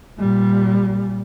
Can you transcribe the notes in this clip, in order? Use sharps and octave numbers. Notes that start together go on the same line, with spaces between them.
A#2 G3